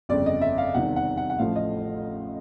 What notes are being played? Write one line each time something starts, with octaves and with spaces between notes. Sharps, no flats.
G1 F2 C#3 D5
D#5
E5
F5
E2 C3 D#3 G3 F#5
F#5
F#5
F#5
A1 A2 F3 A3 F5
D#5